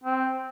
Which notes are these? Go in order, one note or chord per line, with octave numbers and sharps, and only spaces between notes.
C4